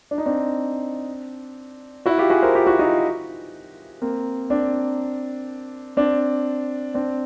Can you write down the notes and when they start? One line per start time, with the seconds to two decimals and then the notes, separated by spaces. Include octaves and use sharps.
0.11 D4
0.18 D#4
0.26 C4 D4
2.06 E4 F#4
2.18 F4 G4
2.30 F#4 G#4
2.42 A#4 C5
2.55 F4 G4
2.67 E4 F#4
2.79 D#4 F4
4.02 A#3 C4
4.50 C4 D4
5.97 C4 D4
6.94 C4 D4